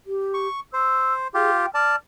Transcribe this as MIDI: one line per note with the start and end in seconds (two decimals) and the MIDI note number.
0.07 0.47 67
0.34 0.60 85
0.73 1.28 72
0.73 1.14 88
1.34 1.66 65
1.34 1.66 67
1.34 1.51 68
1.57 1.70 79
1.74 1.96 74
1.74 1.96 81
1.74 1.95 89